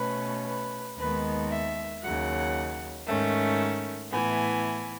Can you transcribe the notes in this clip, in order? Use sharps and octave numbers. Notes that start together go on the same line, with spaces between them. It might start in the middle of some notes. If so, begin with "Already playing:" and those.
Already playing: B2 A3 C#4 B4
B4
D#2 D#3 G#3 B3 B4
E5
D#2 C#3 F#3 F#5
G#2 D#3 A3 C#4
A2 E3 B3 G#5